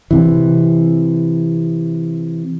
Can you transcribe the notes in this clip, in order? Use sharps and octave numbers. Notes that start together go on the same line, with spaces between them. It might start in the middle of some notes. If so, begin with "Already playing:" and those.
C3 E3